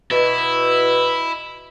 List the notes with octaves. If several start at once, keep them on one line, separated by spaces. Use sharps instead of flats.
B2 E4